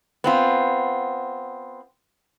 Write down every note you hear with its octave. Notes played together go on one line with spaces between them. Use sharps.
B3 C4 F4